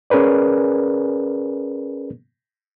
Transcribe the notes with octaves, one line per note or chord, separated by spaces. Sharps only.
C#4 G#4 A#4 B4 D5